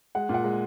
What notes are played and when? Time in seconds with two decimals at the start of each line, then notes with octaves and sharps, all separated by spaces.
0.15 G#3 F#5
0.29 A#2 F#5
0.44 G#3